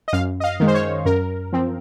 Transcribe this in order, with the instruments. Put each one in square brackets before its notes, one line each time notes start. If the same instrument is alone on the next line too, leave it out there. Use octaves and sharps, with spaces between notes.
[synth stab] D#5
F#2 F5
D#5
F5
D#3 G#3
C5
C#5
F#2 A#4
F3 C4